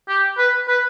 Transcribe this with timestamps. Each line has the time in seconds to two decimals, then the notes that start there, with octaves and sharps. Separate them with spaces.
0.08 G4
0.38 B4
0.68 B4